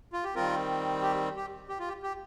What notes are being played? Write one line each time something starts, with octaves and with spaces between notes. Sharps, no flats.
F4
G4
D#3 G3 C4 F4 A#4
G4
G4
G4
F4
G4
G4